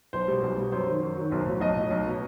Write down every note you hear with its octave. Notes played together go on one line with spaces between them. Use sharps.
B1 C5
B2 G3
B1
B2 G3
F#2 C5
D#3 F#3
F#2
D#3 F#3
B1 C5
A2 F#3
B1 D#5
A2 F#3
B1
B2 F#3